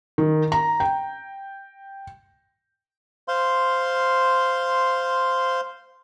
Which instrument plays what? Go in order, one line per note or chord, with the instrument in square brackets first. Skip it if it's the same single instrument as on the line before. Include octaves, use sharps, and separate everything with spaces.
[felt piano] D#3
A#5
G5
[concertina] C5 F5 C6